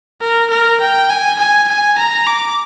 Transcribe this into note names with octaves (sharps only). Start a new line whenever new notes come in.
A#4
A#4
G5
G#5
G#5
G#5
A#5
D6